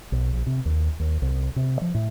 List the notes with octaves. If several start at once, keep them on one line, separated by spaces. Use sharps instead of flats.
B1
A#1
C3
D#2
D#2
C2
C3
F3
A2